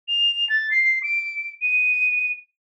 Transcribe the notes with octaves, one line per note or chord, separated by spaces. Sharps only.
F7
A6
C7
D7
D#7